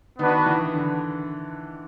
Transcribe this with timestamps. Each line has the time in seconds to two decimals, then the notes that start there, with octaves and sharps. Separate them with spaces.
0.19 D#3 B3 D4 F#4 B4
0.46 E3
0.73 D3